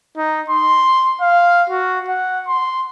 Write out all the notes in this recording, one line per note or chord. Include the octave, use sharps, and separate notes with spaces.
D#4
C6
F5
F#4
F#5
C6